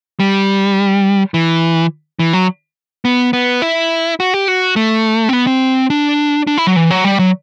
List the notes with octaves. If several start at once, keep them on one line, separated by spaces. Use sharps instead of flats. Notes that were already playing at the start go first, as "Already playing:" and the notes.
G3
E3
E3
F#3
B3
B3
E4
F#4
G4
F#4
A3
C4
B3
C4
D4
D4
E4
F#3
E3
F#3
G3
F#3